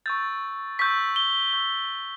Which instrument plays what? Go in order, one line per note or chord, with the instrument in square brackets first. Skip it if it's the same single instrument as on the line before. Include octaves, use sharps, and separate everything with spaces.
[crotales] C#6 E6 G6 A6
C#6 E6 G6 B6
G7
C#6 E6 G6